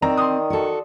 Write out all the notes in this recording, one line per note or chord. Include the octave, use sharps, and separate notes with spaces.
D#3 C4 D5 A#5
C6 D#6
F#4 A4